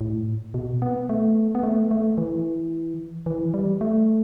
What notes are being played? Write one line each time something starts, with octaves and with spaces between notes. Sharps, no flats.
A2
B2
B3
A3
B3
A3
A3
E3
E3
G3
A3